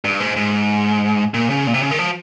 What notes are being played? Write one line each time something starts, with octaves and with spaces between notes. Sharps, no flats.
G2
G#2
G#2
A#2
C#3
A#2
C3
C#3
D#3
F3